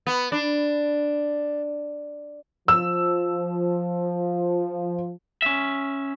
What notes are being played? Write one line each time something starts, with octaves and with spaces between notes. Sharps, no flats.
B3
D4
F3 E6
C#4 E5